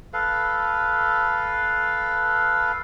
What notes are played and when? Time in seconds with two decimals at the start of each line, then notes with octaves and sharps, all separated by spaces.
0.13 A4 B4 F5